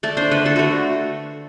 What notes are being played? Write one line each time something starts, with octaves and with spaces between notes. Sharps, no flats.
A3 D5
D4 C5
D3 B4
D3 A4
A3 F#4